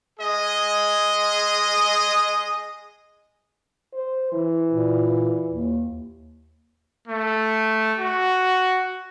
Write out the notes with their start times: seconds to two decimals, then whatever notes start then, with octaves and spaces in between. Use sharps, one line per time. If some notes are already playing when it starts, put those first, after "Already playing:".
0.19 G#3 G#4 D#5
3.93 C5
4.32 E3
4.72 A#2
5.49 D#2
7.08 A3
7.99 F#4